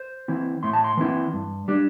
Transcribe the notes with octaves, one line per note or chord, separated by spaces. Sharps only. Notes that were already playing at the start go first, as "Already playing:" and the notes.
Already playing: C5
E3 C4 E4
A2 C6
A5
C6
E3 C4 E4
G2
G3 D4